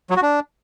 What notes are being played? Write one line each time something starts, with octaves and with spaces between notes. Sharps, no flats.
F#3
F#4
D4